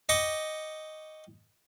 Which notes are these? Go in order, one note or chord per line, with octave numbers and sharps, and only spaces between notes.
D#5 G5 C#6 D6